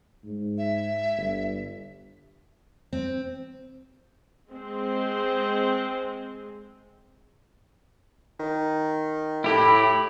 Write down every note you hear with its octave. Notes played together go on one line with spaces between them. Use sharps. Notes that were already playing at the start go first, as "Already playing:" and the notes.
G#2
E5
G1
C4
G#3 C4
D#3
A2 E4 G4 B5